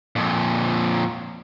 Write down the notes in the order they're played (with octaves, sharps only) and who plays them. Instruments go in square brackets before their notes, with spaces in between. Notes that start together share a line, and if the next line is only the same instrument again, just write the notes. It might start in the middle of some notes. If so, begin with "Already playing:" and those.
[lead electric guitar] F2 A#2